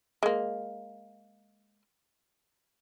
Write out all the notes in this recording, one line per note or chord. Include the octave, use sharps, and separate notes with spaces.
G#3 A#3